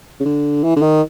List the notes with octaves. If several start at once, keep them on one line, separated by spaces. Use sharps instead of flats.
C#3
D3
E3
D3
D#3